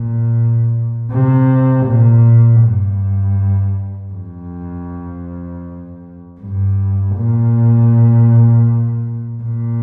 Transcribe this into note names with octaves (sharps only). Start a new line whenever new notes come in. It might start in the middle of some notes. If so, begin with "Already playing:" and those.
Already playing: A#2
C3
A#2
G2
F2
G2
A#2
A#2